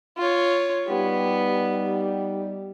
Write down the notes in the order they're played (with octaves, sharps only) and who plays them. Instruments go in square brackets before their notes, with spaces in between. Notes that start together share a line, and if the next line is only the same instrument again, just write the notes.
[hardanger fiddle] F4 C#5
[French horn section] G3 D#4 G4 [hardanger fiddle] B3